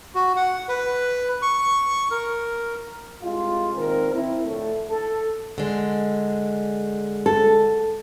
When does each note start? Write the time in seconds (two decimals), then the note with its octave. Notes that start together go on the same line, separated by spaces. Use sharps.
0.15 F#4
0.36 F#5
0.69 B4
1.42 C#6
2.11 A#4
3.23 C2 G#3 F4
3.75 G#1 A#2 D#3 C4 A#4
4.14 C4 E4
4.44 A2 D3 F3 A3
4.90 A4
5.58 D3 G#3
7.26 A4